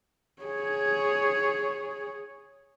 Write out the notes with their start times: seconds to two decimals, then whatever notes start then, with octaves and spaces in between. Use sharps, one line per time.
0.42 G#4 C#5